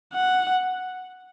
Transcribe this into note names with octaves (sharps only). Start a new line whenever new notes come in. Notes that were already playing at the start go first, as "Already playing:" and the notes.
F#5